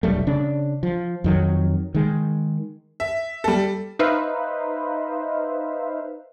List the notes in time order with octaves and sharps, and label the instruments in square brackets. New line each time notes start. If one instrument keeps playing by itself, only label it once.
[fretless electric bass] F1 B1 G3 A3
C#3 D4
F3
F2 D#3 F#3
D#3 G#3
[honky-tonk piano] E5
G3 A4
[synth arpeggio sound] D#4 B4 C5 E5 F5